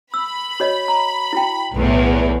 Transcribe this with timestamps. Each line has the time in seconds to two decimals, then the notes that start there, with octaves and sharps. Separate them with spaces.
0.14 B5 E6
0.60 F#4 C#5 D#5
0.88 A#5
1.33 E4 F#4 G5
1.72 B1 E2 A2